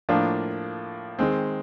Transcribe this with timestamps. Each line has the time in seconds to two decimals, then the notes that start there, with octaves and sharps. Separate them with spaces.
0.09 A2 F3 A#3 D4 F4
1.19 D#3 G#3 C4